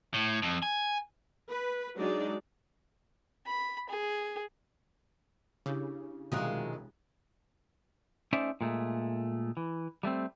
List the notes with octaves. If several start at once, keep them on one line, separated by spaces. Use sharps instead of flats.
A2
F2
G#5
B4
F#3 G#3 D4 D#4 F#4 D5
B5
G#4
C#3 D4 E4 G4
E1 B1 C3 D#3 G#3 F4 D#6 F#6
A3 C#4 D#4 C5 D5 E5
A#2 G#3 A3
E3
G3 A3 A#3 C4